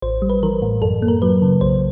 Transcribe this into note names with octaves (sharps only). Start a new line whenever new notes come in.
A1 C5
G3
B4
E3 A#4
A2
F#2 A4
A#3
A#4
F#3 B4
C#3
B1 C5